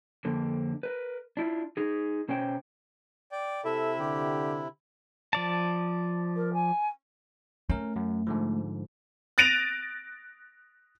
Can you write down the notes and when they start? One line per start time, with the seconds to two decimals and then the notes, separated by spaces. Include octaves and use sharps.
0.25 F2 D3 A#3
0.83 A#4 B4
1.37 D4 E4 F4
1.77 D#4 G#4
2.28 B2 C#4 C5 C#5 G5
3.32 D5 G5
3.65 C3 E4 A4 E5
3.99 D3 G4
5.33 F3 D5 A5
6.36 A#4
6.53 G#5
7.69 A3 C#4 A#4
7.96 F#2
8.27 G#2 D3 F3
9.38 F#6 A6 A#6 D7 D#7 F7